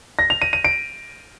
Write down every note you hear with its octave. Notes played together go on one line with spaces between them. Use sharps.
A#6
F7
D#7
D#7
D7